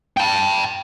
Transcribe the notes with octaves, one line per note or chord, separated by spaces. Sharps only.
G5 A5